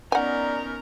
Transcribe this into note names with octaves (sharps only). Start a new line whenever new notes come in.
B3 C#4 D#4 A#4 D5 F#5 G#5